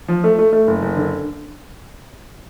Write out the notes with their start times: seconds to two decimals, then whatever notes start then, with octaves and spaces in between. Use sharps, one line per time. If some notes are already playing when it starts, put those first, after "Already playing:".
0.08 F3
0.24 A3
0.38 A3
0.53 A3
0.67 F#1
0.82 F#1
0.97 D3